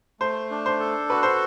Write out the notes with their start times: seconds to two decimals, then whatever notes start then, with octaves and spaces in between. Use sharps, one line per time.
0.20 A3 C5
0.50 D4
0.66 C5
0.80 A4
1.10 F#4 B4
1.23 C5